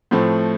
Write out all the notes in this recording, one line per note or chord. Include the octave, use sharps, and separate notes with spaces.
A2 F3 A3 C4